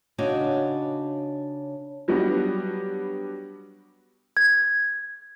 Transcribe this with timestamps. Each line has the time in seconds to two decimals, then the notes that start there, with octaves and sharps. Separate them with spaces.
0.18 C#3 D4 D#4 F#4 C#5 D#5
2.08 F#3 G3 B3 D4 F#4
4.37 G#6